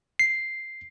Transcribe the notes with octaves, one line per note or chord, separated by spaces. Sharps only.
C7